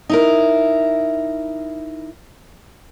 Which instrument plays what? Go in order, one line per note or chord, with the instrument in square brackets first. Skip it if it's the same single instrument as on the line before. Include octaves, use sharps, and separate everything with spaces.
[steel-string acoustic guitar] D#4 E4 A#4